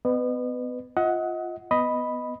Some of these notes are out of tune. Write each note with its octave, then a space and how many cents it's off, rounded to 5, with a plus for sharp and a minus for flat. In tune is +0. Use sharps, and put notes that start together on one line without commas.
B3 +35 B4 +15 D#5 -35
F4 +0 D#5 +30 F#5 +0
B3 +5 D#5 +0 B5 +0